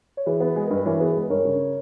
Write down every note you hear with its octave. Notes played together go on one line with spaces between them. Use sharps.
C#5
E3 G#4 B4
B3 G#4 B4
G#3 G#4
A#4
G2
B4
E3 A#4 C#5
B3 G#4 B4
G#3
G2 A#4 C#5
C#3